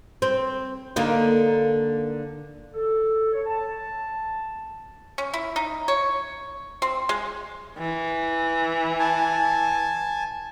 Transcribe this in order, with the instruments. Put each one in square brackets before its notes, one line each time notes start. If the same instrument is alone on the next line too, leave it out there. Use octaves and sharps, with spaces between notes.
[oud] C4
D3 A#3 D#4
[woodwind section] A4
C#5
A5
[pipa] C#4
E4
D#4
C#5
C4
G#3
[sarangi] E3
[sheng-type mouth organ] G#5 A5